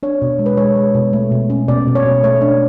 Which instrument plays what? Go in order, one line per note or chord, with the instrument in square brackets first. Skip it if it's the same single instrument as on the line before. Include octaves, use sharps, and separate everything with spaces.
[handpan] D4 C#5
B2
G#3
B4
G#3 C#5
G#3
B2
A3
B2
C#4
B2 D5
B2
C#5
B2
A3 C#5
D4